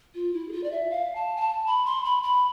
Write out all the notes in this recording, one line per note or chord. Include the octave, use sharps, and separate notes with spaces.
F4
E4
G#4
F4
D5
E5
F5
A5
G#5
A5
B5
C6
B5
B5